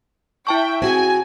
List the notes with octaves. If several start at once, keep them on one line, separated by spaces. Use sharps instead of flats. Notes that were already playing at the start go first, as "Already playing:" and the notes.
E4 E5 G5 A5 C#6
C4 F#4 G#4 G#5